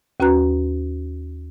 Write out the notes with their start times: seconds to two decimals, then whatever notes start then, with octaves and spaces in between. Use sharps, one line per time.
0.20 D#2 C#4 F#4 B4 A#5 F#6